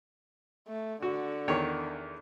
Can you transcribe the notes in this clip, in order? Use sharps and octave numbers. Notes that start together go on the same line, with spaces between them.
A3
D3 F#4
E2 D#3 C#5